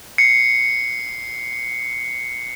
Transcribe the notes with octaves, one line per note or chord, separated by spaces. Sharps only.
C7 C#7